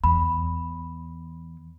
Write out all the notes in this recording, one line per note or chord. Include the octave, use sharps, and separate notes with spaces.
E2 B5